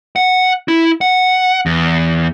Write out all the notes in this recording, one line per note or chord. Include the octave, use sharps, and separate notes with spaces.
F#5
E4
F#5
E2